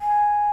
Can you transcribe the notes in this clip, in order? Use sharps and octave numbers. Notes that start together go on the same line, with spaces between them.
G#5